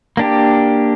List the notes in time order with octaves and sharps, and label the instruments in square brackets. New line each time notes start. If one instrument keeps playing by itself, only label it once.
[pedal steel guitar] A#3 D4 G4